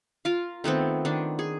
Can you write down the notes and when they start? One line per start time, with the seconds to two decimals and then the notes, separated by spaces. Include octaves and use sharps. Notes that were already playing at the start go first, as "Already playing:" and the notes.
0.25 F4 A#4 F5
0.64 D#3 A3 B3 C4
1.05 D#3 D4
1.39 G#4